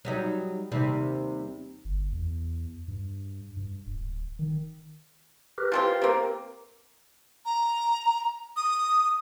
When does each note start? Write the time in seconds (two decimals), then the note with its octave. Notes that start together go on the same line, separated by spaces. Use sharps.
0.05 F#3 G3 D#4
0.72 D#2 C3 G3
1.85 G1
2.12 E2
2.88 G2
3.57 G2
3.86 D1
4.39 D#3
5.58 G4 A#4 B4
5.72 F3 C4 F4
6.02 A#3 C4
7.45 A#5
8.56 D#6